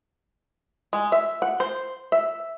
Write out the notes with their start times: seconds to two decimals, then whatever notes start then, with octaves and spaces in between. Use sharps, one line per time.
0.93 G#3
1.12 E5
1.42 F#5
1.60 C5
2.12 E5